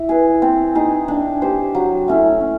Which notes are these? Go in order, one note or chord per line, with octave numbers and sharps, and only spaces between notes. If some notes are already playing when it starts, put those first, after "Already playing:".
Already playing: E4
G#4 B4
C4
D#4 G#4
D4
G4 C5
F#3
A3 C#4 E4
C#4